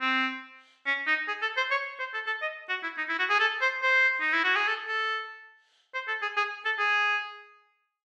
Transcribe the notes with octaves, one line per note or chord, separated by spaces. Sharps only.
C4
C#4
D#4
G#4
A4
C5
C#5
C5
A4
A4
D#5
F#4
E4
D#4
E4
F#4
G#4
A4
C5
C5
D#4
E4
F#4
G#4
A4
A4
C5
A4
G#4
G#4
A4
G#4